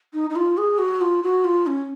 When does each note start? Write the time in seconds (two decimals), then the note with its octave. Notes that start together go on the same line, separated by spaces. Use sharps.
0.14 D#4
0.30 D#4
0.36 F4
0.57 G#4
0.79 F#4
1.01 F4
1.23 F#4
1.45 F4
1.67 C#4